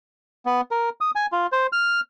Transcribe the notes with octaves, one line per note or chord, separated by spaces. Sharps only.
B3
A#4
D#6
G#5
F4
C5
F6